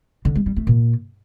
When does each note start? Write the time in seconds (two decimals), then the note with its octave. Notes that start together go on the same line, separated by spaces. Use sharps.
0.25 D3
0.35 G#3
0.46 G3
0.56 A3
0.67 A#2